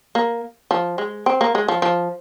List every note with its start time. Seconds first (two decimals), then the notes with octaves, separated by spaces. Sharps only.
0.15 A#3
0.71 F3
0.98 G#3
1.26 C4
1.41 A#3
1.55 G#3
1.68 F3
1.82 F3